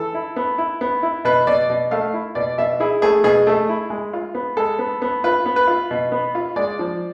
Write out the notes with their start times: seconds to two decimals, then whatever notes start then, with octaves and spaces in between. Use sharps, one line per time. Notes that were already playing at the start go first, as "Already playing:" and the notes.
Already playing: E3 A4
0.14 E4
0.36 B3
0.58 E4
0.81 B3
1.03 E4
1.25 B2 B4
1.47 B2 D5
1.70 B2
1.91 A3 F5
2.14 E4
2.35 B2 D5
2.58 B2 E5
2.80 E4 G#4
3.02 A3 G#4
3.24 B2 G#4
3.47 A3
3.69 E4
3.90 G#3
4.13 F4
4.35 B3
4.57 G#3 A4
4.79 B3
5.02 B3
5.24 F4 B4
5.46 B3
5.56 B4
5.67 F4
5.91 B2
6.12 B3
6.35 F4
6.56 G#3 D5
6.79 F3